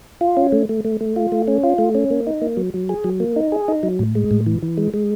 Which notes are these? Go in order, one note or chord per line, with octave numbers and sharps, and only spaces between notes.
F4
C#4
A3
A3
A3
A3
F4
A3
C#4
F4
A3
C#4
A#3
D#4
A#3
F#3
F#3
G#4
F#3
A#3
D#4
G#4
D#4
F#3
A2
G#3
A2
E3
E3
G#3
G#3